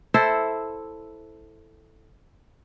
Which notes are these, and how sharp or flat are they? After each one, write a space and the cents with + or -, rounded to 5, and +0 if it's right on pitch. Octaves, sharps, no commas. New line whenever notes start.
E4 -5 A4 +0 C5 +0